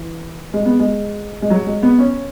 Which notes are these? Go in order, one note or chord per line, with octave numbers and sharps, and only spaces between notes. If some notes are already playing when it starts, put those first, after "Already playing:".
Already playing: E3
G#3
B3
G#3
G#3
F#3
G#3
B3
C#4